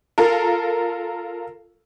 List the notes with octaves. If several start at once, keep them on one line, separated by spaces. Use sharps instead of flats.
F4 A4 A#4